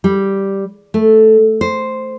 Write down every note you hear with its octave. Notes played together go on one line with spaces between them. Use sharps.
G3
A3
C5